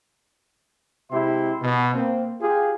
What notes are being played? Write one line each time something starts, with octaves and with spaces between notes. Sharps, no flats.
C3 G#3 E4 G4 E5 C6
B2
A#3 C4
F4 G4 G#4